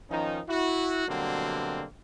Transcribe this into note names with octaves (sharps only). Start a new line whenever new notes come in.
D#3 F3 C#4 D#4
E4 F#4
B2 D3 F#3 G3 A#3 C4